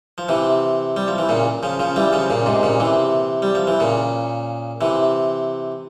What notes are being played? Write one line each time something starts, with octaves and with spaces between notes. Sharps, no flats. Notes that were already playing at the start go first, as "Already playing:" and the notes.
F3
C3 E3
G3
F3
E3
A#2 C#3
C#3 F3
C#3 F3
E3 G3
C#3 F3
A#2 C#3
G#2 C3
A#2 C#3
C3 E3
G3
F3
E3
A#2 C#3
C3 E3